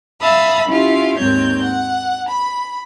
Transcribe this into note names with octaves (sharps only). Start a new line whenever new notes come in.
E5 F5 A5 B5 D#6 E6
C#4 E4 F4 G4 F5
D#2 G#2 A#3 C4 C#5 G6
F#5
B5